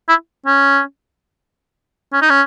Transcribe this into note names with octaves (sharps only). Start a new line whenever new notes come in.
E4
C#4
C#4
D#4
C#4